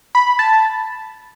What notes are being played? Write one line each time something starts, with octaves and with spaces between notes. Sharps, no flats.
B5
A5